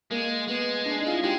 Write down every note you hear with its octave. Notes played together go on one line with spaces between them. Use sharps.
G#3 A#3
G#3 B3
D4
D#4
F4
E4
G#3 G4